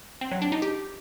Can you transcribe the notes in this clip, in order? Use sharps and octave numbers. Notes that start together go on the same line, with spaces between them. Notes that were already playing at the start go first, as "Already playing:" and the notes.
C4
F#3
D4
D#4
G4